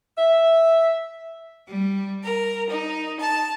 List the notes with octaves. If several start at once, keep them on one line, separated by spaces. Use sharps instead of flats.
E5
G3
A#4
D#4
A5